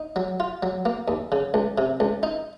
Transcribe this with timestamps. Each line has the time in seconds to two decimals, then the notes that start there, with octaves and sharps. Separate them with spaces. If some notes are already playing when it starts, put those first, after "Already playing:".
Already playing: D#4
0.16 F#3
0.40 F4
0.63 F#3
0.85 A#3
1.08 D#2
1.32 C#3
1.54 C#2
1.78 C3
2.00 C#2
2.23 D#4